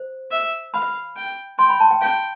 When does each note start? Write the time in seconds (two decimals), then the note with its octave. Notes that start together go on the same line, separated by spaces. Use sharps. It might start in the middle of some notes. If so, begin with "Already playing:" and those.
Already playing: C5
0.31 E5
0.74 F5 B5
1.16 G5
1.59 G5 C6
1.69 B5
1.80 A5
1.91 G5
2.01 F5 G5